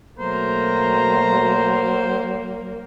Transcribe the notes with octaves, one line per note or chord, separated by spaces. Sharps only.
B2 F#3 A3 A#3 C5 A#5